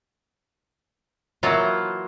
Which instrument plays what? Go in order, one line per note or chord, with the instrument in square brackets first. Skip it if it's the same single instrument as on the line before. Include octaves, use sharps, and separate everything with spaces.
[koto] E3 F#3 A#3 F4